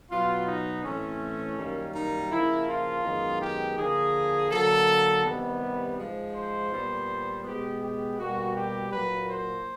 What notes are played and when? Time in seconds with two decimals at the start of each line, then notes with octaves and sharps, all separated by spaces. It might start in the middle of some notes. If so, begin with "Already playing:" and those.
0.11 B2 F#3 B3 F4
0.47 D#4
0.84 A2 E3 A3 C4 C#4
1.58 F#2 D#3 G3 A#3
1.94 D#4
2.31 C#3 F3 A#3 E4
2.68 F4
3.04 F#2 D#3 G#3 B3
3.41 G4
3.78 D3 F3 A#3 G#4
4.51 D3 F#3 A#3 A4
5.25 C3 D#3 G3 B3
5.98 G#2 F3 G#3
6.35 C5
6.72 A#2 G3 B3
7.45 B2 G#3 B3 G4
7.82 G4
8.18 B2 G3 A#3 F#4
8.54 G4
8.92 A#2 F#3 A#3 B4
9.29 C5